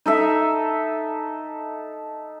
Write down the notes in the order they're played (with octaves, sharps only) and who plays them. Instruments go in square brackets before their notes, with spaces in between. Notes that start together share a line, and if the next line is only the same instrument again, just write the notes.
[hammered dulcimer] D#4 A4 E5